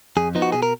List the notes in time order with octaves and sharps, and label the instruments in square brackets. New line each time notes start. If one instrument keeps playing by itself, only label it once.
[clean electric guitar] F2 G#4
F3 B3 D#4
F#4
B2 G#4
A#4